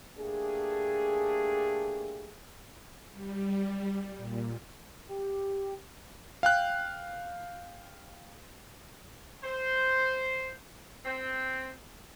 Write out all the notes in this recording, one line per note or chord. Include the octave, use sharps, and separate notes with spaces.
A3 A#3 D4 G4 G#4
G3
A#2
G4
F5 G5 F#6
C5
C4